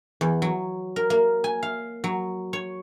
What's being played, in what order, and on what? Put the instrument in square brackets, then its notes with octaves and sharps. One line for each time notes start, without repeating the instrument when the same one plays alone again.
[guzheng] E2
F#3
A#4
A#3
G#5
F5
F#3
C#5